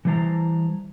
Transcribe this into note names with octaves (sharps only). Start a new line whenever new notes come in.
E3 G3 E4 C5 A5 A#5